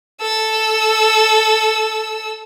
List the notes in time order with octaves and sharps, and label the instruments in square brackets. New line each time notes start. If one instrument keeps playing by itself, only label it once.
[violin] A4 E6